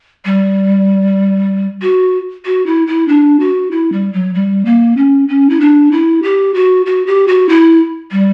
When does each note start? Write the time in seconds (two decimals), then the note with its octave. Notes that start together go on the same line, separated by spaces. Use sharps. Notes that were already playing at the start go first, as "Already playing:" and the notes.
0.25 G3
1.82 F#4
2.45 F#4
2.66 E4
2.87 E4
3.08 D4
3.40 F#4
3.71 E4
3.92 G3
4.13 F#3
4.34 G3
4.65 A#3
4.97 C#4
5.28 C#4
5.49 E4
5.60 D4
5.91 E4
6.23 G4
6.54 F#4
6.86 F#4
7.07 G4
7.28 F#4
7.49 E4
8.11 G3